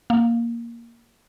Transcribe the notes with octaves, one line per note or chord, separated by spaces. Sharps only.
A#3